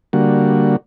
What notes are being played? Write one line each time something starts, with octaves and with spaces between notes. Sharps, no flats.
D3 G3 A#3 F#4